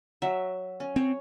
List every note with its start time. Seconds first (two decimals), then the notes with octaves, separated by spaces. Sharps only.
0.22 F#3 E5
0.80 C#4
0.96 C4 C#5